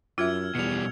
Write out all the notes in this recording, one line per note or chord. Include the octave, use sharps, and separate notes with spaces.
F#2 F4 E5 E6 F6 G#6
E2 B2 G3 C#7 F7